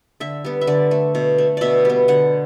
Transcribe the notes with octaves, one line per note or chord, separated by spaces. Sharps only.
D3 E5
G3 B3
E5
D3 D5
A3
B2
A3
B2 D5 E5
G3 B3
D3 F#5